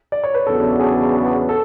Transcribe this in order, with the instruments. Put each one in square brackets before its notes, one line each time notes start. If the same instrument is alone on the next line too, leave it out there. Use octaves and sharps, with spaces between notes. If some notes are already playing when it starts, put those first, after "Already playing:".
[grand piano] D5
C#5
B4
[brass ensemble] E2 C#3 F#3 B3 D4 [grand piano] A4
[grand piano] G#4
A4